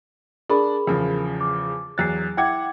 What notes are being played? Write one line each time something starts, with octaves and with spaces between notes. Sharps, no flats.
D4 G#4 A#4 B5
E2 C#3 F3
D6
E2 F#3 F#6 A6 C7
E4 F#5 G5 D6 G#6